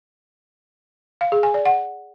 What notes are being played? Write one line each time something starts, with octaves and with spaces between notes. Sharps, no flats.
F5
G#4
G#5
D5
F#5